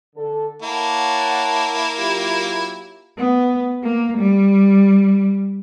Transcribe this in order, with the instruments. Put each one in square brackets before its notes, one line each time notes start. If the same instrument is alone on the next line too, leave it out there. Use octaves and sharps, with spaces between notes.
[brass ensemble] D3 A4
[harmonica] A#3 E4 [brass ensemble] C#5 F#5 A5
[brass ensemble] F#3 F4 G4
[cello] B3
A#3
G3